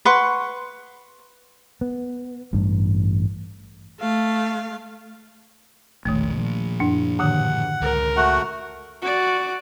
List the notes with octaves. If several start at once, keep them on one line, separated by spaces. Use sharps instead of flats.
B4 F#5 C6 C#6
B3
A1 G2
A3 F5
E1 A#1 D#3 A3
A#2 F3
F#2 D4
A2 D3 D#3 F#5
C#2 A#4
A3 F#4 F#5
F#4 D5